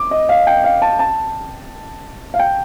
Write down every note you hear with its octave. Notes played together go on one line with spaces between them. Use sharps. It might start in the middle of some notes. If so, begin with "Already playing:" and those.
Already playing: D6
D#5
F5
G5
F5
A5
A5
F5
G5